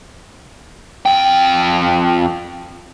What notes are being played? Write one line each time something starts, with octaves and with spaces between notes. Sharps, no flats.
F2 G5